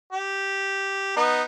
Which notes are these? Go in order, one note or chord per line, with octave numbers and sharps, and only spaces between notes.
G4
B3 D#4